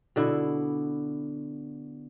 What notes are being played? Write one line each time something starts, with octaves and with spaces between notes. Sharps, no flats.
B2 D3 E4